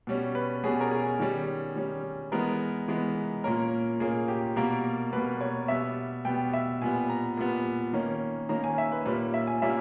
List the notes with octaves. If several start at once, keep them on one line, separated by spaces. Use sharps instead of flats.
B2 G3 C#4
B4
B2 G3 C#4 G#4
A#4
G#4
D#3 G3 C#4
D#3 G3 C#4
E3 G#3 B3 A#4
E3 G#3 B3
A#2 A#3 C#4 A#4
A#2 A#3 C#4 G#4
G4
B2 G3 A#3 A#4
B2 G3 A#3 B4
C#5
B2 G3 B3 E5
B2 G3 B3 G5
E5
A#2 G3 B3 G#5
A#5
A#2 G3 B3
D#3 A#3 C#4
D#3 A#3 C#4 A#5
G#5
E5
B4
A#2 G3 A#3 C#4 B4
E5
G#5
A#2 G3 A#3 C#4 E5